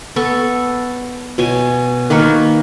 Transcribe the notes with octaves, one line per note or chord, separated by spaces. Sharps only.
B3 A4 C#6
B2 C#5 G#5
D#3 A#3 B4 C#6